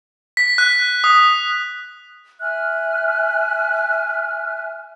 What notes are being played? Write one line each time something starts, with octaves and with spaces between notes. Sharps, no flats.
B6
F#6
D#6
E5 G#5 F6 F#6